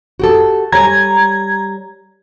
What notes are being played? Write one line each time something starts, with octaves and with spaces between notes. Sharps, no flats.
F#4 G4 A4
G3 C#5 G#5 A#5 G#6